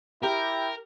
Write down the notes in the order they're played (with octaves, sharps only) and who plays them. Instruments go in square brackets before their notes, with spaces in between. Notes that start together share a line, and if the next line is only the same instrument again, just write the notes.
[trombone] E4 [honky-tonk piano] G4 [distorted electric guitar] A#4